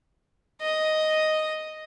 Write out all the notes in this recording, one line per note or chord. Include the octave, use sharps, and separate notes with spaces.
D#5